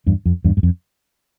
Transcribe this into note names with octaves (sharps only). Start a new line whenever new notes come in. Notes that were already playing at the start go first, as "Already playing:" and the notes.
E2 G2
F2
E2 G2
G2
F2